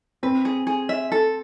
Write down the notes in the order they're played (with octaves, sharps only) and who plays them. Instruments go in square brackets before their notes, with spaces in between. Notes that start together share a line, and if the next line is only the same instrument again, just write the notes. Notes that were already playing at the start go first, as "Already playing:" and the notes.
[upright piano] C4 [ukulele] B4
[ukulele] G#4
G#4
E5
A4